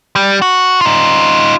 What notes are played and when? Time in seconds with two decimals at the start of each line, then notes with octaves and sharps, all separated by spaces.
0.16 G3
0.42 F#4
0.81 D#4 F4